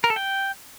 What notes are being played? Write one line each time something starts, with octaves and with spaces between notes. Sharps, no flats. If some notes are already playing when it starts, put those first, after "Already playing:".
A#4
A4
G5